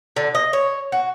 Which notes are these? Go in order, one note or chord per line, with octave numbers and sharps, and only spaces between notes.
D3
D#5
C#5
F#4